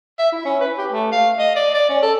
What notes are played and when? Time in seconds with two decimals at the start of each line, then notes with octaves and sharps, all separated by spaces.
0.19 E5
0.32 E4
0.45 C#4
0.60 B4
0.78 G4
0.92 A3
1.12 F5
1.39 D#5
1.56 D5
1.74 D5
1.89 C#4
2.03 A4